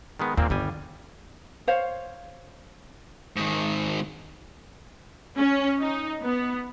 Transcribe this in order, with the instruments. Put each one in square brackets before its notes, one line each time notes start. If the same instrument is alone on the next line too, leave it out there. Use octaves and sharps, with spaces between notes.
[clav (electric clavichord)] D#3 G#3 B3
[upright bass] D#2 [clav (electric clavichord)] A#2 A#3 C4
[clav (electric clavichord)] G1 G3 G#5 [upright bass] D#3
[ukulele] C5 C#5 F5
[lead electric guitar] G#2 D#3
[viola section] C#4
D#4
B3